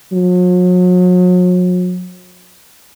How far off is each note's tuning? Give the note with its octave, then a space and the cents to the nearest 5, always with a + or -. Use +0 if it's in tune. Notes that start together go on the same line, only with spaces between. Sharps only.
F#3 -40